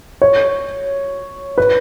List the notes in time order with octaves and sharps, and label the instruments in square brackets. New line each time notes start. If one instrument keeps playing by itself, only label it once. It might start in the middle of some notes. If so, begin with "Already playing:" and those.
[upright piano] C#5
B4